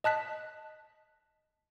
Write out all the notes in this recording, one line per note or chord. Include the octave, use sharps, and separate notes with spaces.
D#5 A5 F#6 B6